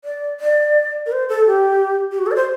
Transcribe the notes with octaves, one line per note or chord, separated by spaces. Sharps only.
D5
D5
A#4
C5
A4
G4
G4
F#4
A4
D5
C5